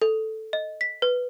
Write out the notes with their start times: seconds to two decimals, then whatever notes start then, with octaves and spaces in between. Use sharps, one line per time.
0.02 A4
0.53 D#5
0.81 B6
1.02 B4